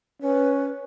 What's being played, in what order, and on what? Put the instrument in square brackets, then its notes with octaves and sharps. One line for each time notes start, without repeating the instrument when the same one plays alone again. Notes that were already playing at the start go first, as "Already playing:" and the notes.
[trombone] C#4 [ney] B4